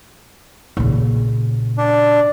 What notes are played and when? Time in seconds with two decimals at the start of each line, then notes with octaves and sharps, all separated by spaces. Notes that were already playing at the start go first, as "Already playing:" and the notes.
0.77 A#2 C#3
1.78 D4